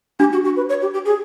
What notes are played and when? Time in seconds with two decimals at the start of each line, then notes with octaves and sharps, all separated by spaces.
0.20 D4 G4
0.32 F#4
0.44 F#4
0.57 B4
0.69 C#5
0.82 G4
0.94 G4
1.06 G#4